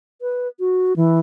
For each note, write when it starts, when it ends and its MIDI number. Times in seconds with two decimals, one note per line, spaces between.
0.22 0.48 71
0.60 0.96 66
0.96 1.20 52